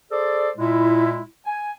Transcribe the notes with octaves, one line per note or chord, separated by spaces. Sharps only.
G#4 A4 C5 D5
A#2 G#3 E4
G#5